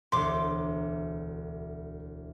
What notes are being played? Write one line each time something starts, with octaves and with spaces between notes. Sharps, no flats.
E1 D2 C6 D6